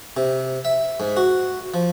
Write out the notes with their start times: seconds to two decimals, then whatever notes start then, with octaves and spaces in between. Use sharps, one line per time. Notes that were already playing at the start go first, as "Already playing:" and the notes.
0.17 C3
0.65 E5
1.00 G#2
1.17 F#4
1.74 F3